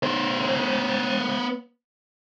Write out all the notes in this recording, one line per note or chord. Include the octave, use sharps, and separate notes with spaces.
B3 C5